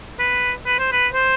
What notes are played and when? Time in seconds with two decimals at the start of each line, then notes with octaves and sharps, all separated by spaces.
0.19 B4
0.66 B4
0.79 C5
0.92 B4
1.14 C5